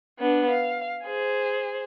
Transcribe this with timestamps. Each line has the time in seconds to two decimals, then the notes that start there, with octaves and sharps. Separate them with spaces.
0.19 B3 D4
0.51 F5
1.04 G#4 C5